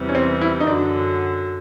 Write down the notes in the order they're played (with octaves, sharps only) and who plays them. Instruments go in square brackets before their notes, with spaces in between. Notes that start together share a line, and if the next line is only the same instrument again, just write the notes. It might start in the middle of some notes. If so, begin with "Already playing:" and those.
Already playing: [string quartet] E2 C3 E3 G3
[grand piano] C#4
C4
E4
D#4
[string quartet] F#2 D3 F#3 [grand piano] D4